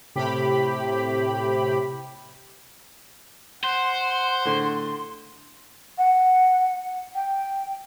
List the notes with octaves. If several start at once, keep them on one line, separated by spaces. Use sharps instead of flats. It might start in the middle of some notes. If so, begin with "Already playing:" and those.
A2 C3 G4 B5
C5 F#5 C6
A2 D3
F#5
G5